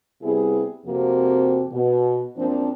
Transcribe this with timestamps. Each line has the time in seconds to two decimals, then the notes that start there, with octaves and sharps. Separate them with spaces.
0.23 C3 G3 B3 E4 G#4
0.86 F2 C3 F3 A#3 F#4
1.72 B2
2.37 F#2 F3 A#3 C4 D4